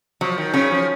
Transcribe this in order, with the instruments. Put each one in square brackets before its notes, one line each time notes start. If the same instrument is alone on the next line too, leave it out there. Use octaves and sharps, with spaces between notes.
[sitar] F3 [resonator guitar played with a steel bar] F#3
[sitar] D#3
[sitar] C#3 [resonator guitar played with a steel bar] C#4
[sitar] F3